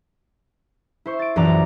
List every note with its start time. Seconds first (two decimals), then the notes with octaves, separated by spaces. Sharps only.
1.06 E4 C5 C#6
1.19 A6 D7
1.36 A#1 F#2 E3 D5 A#5 D6